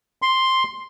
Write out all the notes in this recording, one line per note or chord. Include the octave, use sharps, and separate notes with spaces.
C6